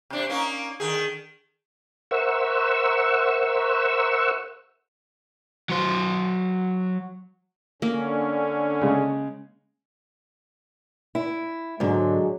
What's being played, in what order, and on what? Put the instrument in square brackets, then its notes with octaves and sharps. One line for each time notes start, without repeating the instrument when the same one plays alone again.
[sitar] C3 D4
A#3 C#4 D#4
D3 D#3 G#4
[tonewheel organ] A#4 C5 E5 F#5 C#6 E6
[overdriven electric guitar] F#3 C5
[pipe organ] D3 C#4 [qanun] A#3
[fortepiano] C#3 G#3
[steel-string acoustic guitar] E4
[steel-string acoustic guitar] G#2 D3 [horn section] F#3 G#3